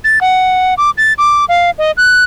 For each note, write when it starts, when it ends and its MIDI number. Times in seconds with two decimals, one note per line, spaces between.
0.04 0.19 93
0.21 0.74 78
0.78 0.90 86
0.98 1.13 93
1.18 1.45 86
1.49 1.70 77
1.78 1.91 75
1.97 2.24 90